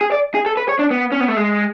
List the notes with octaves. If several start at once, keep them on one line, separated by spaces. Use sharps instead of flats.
G#4
D5
G#4
A4
B4
C#5
D4
B3
C#4
B3
A3
G#3